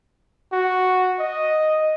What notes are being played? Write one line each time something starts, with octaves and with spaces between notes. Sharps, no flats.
F#4
D#5